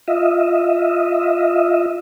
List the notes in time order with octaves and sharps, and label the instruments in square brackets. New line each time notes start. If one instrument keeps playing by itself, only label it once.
[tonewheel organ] F4 D#5 E5